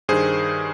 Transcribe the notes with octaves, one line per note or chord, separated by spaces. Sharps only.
G2 D#3 G#4 C5